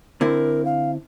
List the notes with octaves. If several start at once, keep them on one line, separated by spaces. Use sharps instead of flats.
D3 C4 E4 A#4
F5